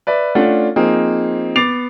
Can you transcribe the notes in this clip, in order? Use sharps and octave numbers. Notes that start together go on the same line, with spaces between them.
B4 D5 E5
A3 C#4 D4 F4 D5 F#5
F3 A#3 C4 D#4 G#4
B3 D6 A6 C7 F7